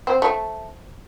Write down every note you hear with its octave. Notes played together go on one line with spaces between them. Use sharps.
C4
A3